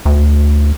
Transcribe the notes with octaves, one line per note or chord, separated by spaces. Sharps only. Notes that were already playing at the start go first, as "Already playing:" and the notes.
D2